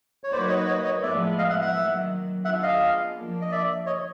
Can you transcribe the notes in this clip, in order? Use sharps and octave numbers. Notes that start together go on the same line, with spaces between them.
C#5
F#3 A#3 D#4 F#4 B4 C5 D5
C#5 D#5
C#5 D#5
C#5 D#5
A2 F3 G#3 B3 D5 E5
D#5 F5
E5 F#5
E5 F#5
D#3 F#3 A#3
B3 D4 F4 G#4 E5 F#5
D#5 F5
F3 A#3 D4
D#5
D5 E5
C#5 D#5